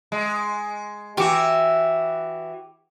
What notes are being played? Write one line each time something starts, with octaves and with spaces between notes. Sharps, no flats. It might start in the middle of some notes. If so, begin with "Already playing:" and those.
G#3
E3 F#4 G4 D6